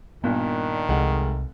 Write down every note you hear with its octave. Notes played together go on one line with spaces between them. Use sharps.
G2 A#2 D#3 B3
F1 C2 G#3 F#5